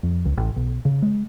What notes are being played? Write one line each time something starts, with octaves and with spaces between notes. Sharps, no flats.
F2
C#2
A1
B1
C#3
G#3